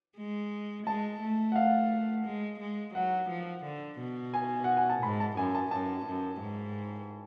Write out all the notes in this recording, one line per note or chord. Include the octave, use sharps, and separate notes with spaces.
G#3
G#3 A5
A3
F#5
F5
G#3
G#3
F#3 F#5
F3
D3
B2
G#5
F#5
G#5
A5
G#2 B5
A5
F#2 G#5
A5
F#2 A5
F#2
G#2